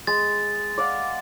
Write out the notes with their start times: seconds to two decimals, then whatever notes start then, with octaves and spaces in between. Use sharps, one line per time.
0.07 G#3 A6
0.78 D5 F5 F#5